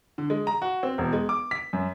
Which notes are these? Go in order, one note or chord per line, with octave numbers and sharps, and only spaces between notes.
D3
G#3
A#5
F#4
C4
E1
G#3
D6
B6
F#2